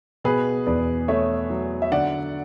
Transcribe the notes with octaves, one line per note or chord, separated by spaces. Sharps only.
B2 G#4 B4
E2 B4 D5
A3 C#5 E5
F#3
E5
D3 D5 F#5